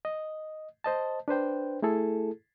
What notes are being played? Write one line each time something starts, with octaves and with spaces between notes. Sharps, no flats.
D#5
C5 D#5 A5
D4 B4 C5 G5
A3 E4 G#4 A4